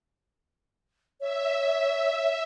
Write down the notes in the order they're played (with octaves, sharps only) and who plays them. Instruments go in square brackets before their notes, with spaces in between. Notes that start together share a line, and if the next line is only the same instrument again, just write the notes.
[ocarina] C#5 [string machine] E5